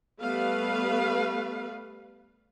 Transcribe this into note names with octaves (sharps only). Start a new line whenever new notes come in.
G3 A3 B3 B4 F5